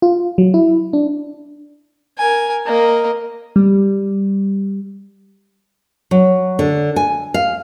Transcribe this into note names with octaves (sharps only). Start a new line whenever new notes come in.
F4
F#3
E4
D4
A#4 G#5
A#3 D#5
G3
F#3
D3
G#5
F5